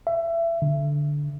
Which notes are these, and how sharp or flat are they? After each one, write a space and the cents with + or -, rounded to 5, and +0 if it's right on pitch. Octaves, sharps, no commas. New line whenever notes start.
E5 +25
D3 -5